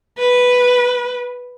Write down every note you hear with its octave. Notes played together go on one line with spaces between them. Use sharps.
B4